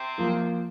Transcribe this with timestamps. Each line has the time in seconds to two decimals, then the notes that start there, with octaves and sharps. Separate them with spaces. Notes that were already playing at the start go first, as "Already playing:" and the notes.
Already playing: C3 C4
0.18 F3 A#3 F4